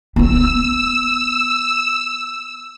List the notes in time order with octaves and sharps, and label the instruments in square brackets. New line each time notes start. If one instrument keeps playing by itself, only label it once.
[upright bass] B3 E4 [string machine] E6